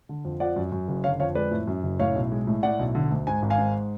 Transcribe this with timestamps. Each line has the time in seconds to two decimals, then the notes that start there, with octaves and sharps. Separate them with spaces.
0.09 D3
0.25 F2
0.40 F3 D5 F#5
0.56 F#2
0.72 F#2
0.88 F#1
1.04 D3 C#5 F5
1.20 F2 C#5 F5
1.35 G#3 B4 D5
1.51 A2
1.67 F#2
1.83 F#1
1.99 A2 C#5 F5
2.15 B1
2.32 G#3
2.47 A2
2.63 A2 D5 F#5
2.79 B1
2.95 D3
3.11 D2
3.27 G#2 G#5
3.42 G#1
3.50 F5 G#5
3.58 G#2